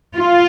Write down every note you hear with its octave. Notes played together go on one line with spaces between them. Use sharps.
F4